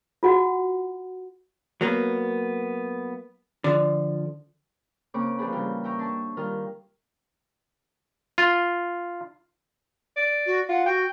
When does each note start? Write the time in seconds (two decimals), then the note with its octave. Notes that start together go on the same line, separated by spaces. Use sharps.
0.23 F4 F#4 F#5
1.81 F#3 A#3 B3
3.64 D3 F3
5.14 C#3 A#3 C4 C#6 D6
5.39 F3 C4 D4 G#4 B4
5.52 C#3 E3 G3 A#3 F4
5.84 E5 G5 A#5 C#6
5.99 D4 A5 C#6
6.37 D#3 G3 D#4 F4 A#4
8.38 F4
10.16 D5
10.46 F#4
10.69 F4 F#5
10.86 F#4 G5